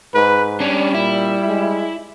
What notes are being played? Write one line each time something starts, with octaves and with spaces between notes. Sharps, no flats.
G#2 B4
G3 C#4 D4
A#2 E4
G#3